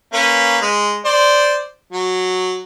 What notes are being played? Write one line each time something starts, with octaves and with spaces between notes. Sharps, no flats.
A#3 C#4 B4
G#3
C5 D5
F#3